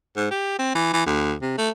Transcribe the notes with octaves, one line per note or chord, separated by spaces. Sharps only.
G#2
G4
C4
E3
E3
D2
C3
A3